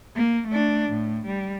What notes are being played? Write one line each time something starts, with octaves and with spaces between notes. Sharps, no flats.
A#3
A3 D4
A2
G3